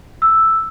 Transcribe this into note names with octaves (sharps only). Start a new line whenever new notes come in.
E6